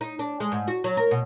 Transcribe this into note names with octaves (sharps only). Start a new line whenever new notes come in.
D#4
D4
G#3
G#2
F#4
F#3
A#4
B2